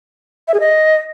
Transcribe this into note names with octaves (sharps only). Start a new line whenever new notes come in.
E5
G#4
D#5